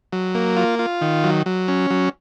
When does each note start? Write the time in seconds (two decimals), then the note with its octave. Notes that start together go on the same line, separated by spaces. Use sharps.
0.13 F#3
0.35 A#3
0.57 F4
0.79 F4
1.01 D#3
1.24 F#3
1.46 F#3
1.68 C#4
1.91 F#3